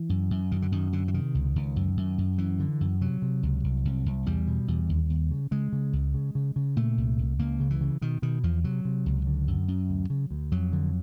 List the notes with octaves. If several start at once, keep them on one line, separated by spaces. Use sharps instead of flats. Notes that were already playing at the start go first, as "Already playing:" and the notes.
Already playing: E3
F#2
F#2
F#2 D#3
D3
F#2 D#3
F#2 D3
E3
C3 D#3
C#2
C#2
F#2
F#2
F#2
F#2 E3
D3
F#2
C3 F#3
C3
C#2
C2
C2
C2
E2 G3
B2
E2
D#2
D#2
C#3
C#3 G#3
C#3
C#2
C#3
C#3
C#3
A#2 A3
C2
C2
C#2 A#3
C#3
E3
C#3
B2 D#3
B2 D#3
E2 F3
C3 F#3
C3
C#2
D3
F#2
F#2
D2
C#3
D2
F2 F#3
D3